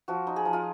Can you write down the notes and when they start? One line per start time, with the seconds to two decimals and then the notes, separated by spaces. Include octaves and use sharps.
0.08 F3 F#4
0.27 D#4
0.36 G#4
0.45 F3
0.53 F4